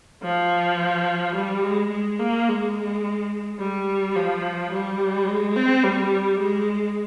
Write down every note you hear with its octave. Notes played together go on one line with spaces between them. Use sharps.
F3
G3
G#3
G#3
A#3
G#3
G3
F3
G3
G#3
C4
G3
G#3